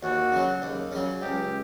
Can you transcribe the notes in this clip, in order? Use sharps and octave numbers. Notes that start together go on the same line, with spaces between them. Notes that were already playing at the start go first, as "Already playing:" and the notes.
D#2 F#4
C#3 F#3
D#2
C#3 F#3
C#2 G4